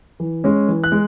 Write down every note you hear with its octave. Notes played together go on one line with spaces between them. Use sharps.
E3
G#3 C#4
E3
F#6
G#3